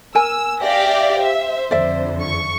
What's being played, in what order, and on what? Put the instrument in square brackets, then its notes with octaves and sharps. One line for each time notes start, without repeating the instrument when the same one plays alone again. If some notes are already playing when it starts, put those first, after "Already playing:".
[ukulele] A#4 G#5 [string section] E6
[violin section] G4 E5 F5 [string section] D5 G5 A#6
[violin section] C5 [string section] E5
[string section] F2 D3 [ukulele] D5 E5
[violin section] C#6